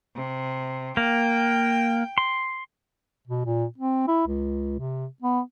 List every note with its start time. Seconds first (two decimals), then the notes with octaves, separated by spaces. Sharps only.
0.16 C3
0.97 A#3 G5
2.18 C6
3.28 B2
3.45 A#2
3.78 C4
4.07 E4
4.27 C#2
4.79 C3
5.22 B3